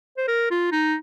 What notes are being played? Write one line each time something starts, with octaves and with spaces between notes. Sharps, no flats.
C5
A#4
F4
D#4